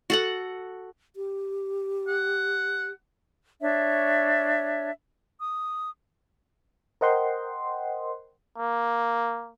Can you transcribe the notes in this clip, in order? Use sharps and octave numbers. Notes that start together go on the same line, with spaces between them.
F#4 A4 F#5
G4
F#5
D4 C#5 E5
D#6
A#4 C5 D#5 F#5 G5 C6
A#3